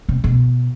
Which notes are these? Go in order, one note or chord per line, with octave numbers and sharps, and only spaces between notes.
C3
B2